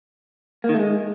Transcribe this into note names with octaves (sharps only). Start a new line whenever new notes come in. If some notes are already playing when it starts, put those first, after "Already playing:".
A#3
D#3
A3
G#3